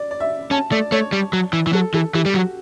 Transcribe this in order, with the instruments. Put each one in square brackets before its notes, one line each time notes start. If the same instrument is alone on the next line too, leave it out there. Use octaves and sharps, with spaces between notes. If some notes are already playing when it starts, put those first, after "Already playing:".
Already playing: [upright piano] D5
D5
E5
[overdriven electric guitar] C#4 [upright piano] A5
[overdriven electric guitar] A3 [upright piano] D5
[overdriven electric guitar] A3 [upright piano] C#5
[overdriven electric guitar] G3
F#3
E3
E3
[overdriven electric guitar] F#3 [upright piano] A4
[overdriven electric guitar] E3 [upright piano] A4
[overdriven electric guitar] E3 [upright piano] G4
[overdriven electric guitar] G3
[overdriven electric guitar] F#3 [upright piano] F#4